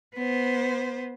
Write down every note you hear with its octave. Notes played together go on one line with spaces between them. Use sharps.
B3 C5